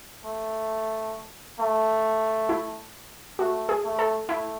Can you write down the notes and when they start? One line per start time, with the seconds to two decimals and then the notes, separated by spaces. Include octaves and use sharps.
0.25 A3
1.60 A3
2.49 E4
3.39 A3 F#4
3.69 G#4
3.84 A3
3.99 A4
4.29 A3 E4